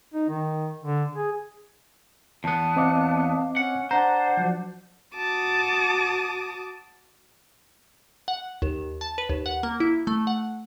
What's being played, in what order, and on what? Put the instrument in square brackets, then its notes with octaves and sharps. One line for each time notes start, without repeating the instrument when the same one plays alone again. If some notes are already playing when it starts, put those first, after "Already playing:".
[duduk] D#4
D#3
D3
G#4
[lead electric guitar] E2 B3 [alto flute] A5
[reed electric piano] C4 D#5 D6 [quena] F5
[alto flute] C#4 [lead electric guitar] F#5
[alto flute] D4 [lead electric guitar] C5 [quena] F#5 [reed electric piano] A#5
[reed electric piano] F3 F#3
[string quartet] F#4 A5 D6 D#6
[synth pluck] F#5
D#2
A5
B4
D#2
F#5
A#3
E4
A3
F#5